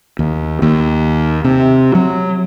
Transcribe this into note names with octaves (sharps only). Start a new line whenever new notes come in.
D#2
D#2
C3
F#3